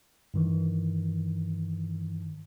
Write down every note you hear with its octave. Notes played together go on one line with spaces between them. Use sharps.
G2 D#3 E3